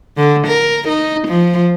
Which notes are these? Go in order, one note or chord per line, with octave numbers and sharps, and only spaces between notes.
D3
A#4
D#4
F3